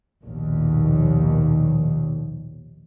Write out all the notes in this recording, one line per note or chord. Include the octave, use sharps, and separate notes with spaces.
A#1 D#2 B2